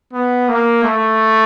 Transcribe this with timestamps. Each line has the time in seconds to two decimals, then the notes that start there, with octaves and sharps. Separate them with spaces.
0.13 B3
0.48 A#3
0.83 A3